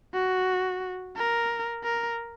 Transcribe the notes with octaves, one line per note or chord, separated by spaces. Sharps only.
F#4
A#4
A#4